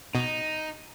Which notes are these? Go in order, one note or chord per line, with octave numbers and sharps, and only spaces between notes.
B2 D#4